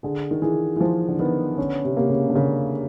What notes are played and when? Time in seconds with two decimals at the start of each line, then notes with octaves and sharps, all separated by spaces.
0.03 D3 G#4
0.31 D#3
0.42 E3 G#4
0.76 E3
0.80 F3 C5
1.08 D3
1.19 D#3 B3
1.58 D3 C#4
1.84 C3
1.97 C3 A#3
2.10 C#3
2.29 D3
2.35 C#3 A#3